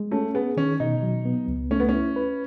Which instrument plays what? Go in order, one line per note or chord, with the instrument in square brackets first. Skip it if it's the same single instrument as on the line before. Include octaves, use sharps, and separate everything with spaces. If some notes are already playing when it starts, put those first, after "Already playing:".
Already playing: [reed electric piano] G#3
[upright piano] A3 [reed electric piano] C#4
[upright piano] B3 [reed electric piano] G#4
[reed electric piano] D#3 [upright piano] C#4
[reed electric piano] B2 [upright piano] D#4
[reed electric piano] F#3
B3
C#2
[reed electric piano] A3 [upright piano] C#4
[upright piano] B3
[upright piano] C#4 [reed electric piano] E4
[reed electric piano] B4